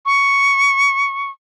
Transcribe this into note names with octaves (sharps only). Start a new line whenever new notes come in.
C#6